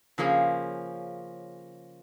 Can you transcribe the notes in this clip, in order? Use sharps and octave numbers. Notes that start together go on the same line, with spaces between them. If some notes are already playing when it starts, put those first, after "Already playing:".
C#3 F3 A#3 C#4 G#4